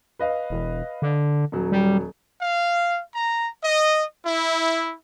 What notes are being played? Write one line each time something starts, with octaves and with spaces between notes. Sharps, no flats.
B4 D#5 F5
E1
D3
D#1 F#3
G3
F5
A#5
D#5
E4